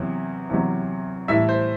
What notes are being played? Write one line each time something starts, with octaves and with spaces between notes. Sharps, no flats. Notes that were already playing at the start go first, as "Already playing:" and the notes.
Already playing: E2 C3 F#3
E2 C3 F#3
A2 E3 G3 E5
C5